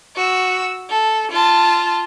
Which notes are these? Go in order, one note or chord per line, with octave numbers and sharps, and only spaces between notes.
F#4 E6
A4
F4 A5